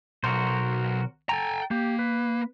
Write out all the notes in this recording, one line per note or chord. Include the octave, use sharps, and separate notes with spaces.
B1 F#4 A#4 C5
A4 G5 G#5 A#5
A#3 G4
B4